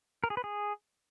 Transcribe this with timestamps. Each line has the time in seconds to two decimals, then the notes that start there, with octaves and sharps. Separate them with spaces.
0.24 A#4
0.30 G#4
0.37 B4
0.44 G#4